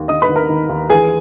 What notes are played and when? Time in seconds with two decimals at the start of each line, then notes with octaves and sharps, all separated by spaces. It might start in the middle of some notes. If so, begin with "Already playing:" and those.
Already playing: D#2
0.08 D#3 D#5 D#6
0.22 B4 B5
0.29 D#2
0.36 A#4 A#5
0.49 D#3
0.69 D#2
0.90 E3 G#4 G#5